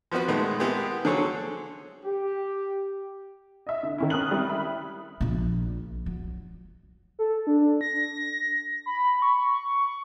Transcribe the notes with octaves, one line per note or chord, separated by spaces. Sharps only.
F3 B3 C4 F#4 B4
A#2 D#3 G#3 A3 B3
G#3 B3 C4 E4 G4 G#4
D3 F#3 G#4 A4 C5 C#5
G4
D#5 E5
D3
D#3 C#4 E4
C#4 A#4 D#6 F6 F#6 F#7
G3 C4 E4
E5 B5
A#1 A#2
F#3
A4
D4
A#6
B5
C#6